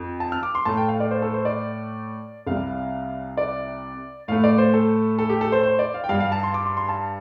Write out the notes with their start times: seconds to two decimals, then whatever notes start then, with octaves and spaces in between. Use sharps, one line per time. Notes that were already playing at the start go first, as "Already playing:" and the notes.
Already playing: F2
0.20 A5
0.32 F6
0.43 D6
0.55 C6
0.65 A2 A3 A5
0.77 G5
0.89 F5
1.00 D5
1.11 C5
1.22 A4
1.34 C5
1.45 D5
2.47 C2 C3 G3 F5
3.37 D5
4.28 A2 A3 F5
4.44 D5
4.58 C5
4.74 A4
5.19 A4
5.30 G4
5.41 A4
5.52 C5
5.63 C5
5.79 D5
5.94 F5
6.04 G5
6.09 G2 F5
6.14 G3
6.20 F5
6.32 A5
6.43 C6
6.54 D6
6.66 C6
6.77 C6
6.89 A5